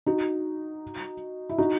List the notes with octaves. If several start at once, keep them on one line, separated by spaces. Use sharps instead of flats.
D#4 F#4
E4
D#4 F#4